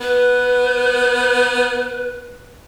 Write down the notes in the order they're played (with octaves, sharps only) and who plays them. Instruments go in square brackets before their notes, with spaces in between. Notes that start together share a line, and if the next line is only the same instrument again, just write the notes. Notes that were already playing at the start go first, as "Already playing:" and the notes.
[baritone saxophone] B3 [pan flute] B4